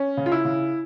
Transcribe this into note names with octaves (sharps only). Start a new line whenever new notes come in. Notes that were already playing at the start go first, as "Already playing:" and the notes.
Already playing: C#4
C#3
F4
E4
C#3